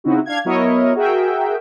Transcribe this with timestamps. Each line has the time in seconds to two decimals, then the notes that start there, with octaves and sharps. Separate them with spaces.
0.04 C#3 C4 D#4 E4 F#4
0.26 D4 F5 G#6
0.45 F#3 B3 E4 A#4 C#5 D#5
0.95 F#4 G#4 A#4 E5 G5